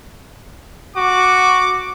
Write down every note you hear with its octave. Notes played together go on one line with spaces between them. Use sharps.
F#4 D6